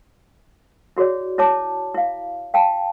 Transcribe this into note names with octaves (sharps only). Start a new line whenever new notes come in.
E4 F#4 G#4 C#5 D5
E4 C#5 A5 D6
E4 F5
F5 G5 A5